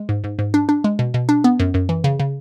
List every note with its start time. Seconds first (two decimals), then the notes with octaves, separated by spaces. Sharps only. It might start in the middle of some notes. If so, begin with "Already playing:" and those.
Already playing: G#3
0.09 G#2
0.24 G#2
0.39 G#2
0.54 D4
0.69 D4
0.84 G#3
0.99 B2
1.14 B2
1.29 D4
1.44 B3
1.59 F#2
1.74 F#2
1.89 E3
2.04 C#3
2.20 C#3